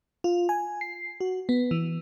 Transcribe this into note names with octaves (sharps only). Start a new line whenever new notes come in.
F4
G#5
C7
F#4
B3
E3